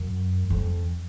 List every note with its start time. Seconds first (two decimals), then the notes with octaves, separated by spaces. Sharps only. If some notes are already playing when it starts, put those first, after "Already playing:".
Already playing: F#2
0.50 F2